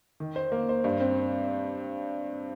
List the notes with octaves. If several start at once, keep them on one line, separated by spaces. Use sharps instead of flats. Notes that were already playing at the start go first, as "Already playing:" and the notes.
D#3
C5
A#3
C5
G2
C4